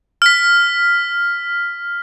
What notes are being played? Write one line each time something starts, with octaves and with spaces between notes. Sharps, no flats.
F6 B6